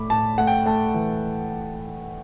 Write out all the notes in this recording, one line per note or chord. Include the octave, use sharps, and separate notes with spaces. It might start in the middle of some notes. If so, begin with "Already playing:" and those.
Already playing: A2 A3 B5 D6
A2 A5
A3 F#5
G5
A3 A5
E3